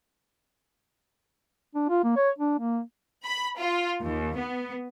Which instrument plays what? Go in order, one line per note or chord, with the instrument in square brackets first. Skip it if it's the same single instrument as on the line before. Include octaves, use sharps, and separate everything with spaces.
[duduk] D4
F4
A#3
C#5
D4
A#3
[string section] B5
F4
D#2
B3